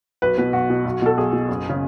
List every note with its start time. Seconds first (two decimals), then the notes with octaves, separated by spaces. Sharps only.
0.22 B1 B4
0.38 B2 B4
0.53 B1 F#4
0.70 B2
0.85 B1
1.02 B2 A4
1.17 B1 G#4
1.33 B2
1.49 F#1
1.69 C#3